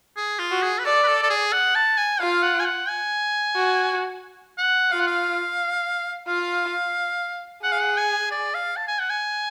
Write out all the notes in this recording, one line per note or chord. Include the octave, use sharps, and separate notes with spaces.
G#4
F4
F#4
G#4
B4
A4 D5
B4
A4
A4
G#4
F#5
A5
G#5
F4 F5
F#5
G#5
F#5
G#5
F#4
F#5
F4 F5
F#5
F5
F4 F5
G#4 F#5
F5
F#5
G#5
D5
F5
A5
G#5
F#5
G#5